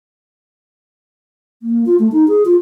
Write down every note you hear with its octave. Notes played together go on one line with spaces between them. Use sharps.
A#3
F4
A3
D#4
G#4
F4